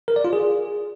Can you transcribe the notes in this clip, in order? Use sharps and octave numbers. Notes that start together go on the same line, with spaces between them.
A#4
D5
F4
G#4